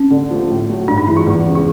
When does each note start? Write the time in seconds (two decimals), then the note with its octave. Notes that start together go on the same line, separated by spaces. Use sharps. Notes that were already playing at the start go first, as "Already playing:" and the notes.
Already playing: C#4
0.10 D3
0.30 F3 A3
0.50 A2
0.69 F#3 A3
0.88 G2 D4
0.98 D#4
1.07 E3 G#3 E4
1.17 F4
1.27 E2
1.46 C#3 F3 G#3
1.55 F4